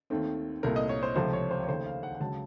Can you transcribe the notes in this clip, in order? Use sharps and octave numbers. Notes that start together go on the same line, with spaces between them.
D#2 D#3 A3 C4
C2 A#2 A3 C4 A#4
D#5
C#5
C5
C#2 C3 F3 A3 C5
C#5
C5
C#5
D#2 C#3 A3 C5
F5
F#5
F#5
C#2 C#3 F#3 A5